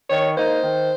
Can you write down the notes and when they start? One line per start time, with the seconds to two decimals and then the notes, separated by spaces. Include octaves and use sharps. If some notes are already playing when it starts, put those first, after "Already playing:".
0.10 D#3 C#5
0.36 A#3 D#4 C5
0.63 D#3